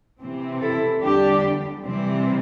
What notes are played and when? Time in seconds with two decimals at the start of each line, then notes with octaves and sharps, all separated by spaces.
0.20 C3 E3 C4
0.60 E4 A4
1.02 E2 D3 G3 D4 G4
1.84 C3 E3 G3 C4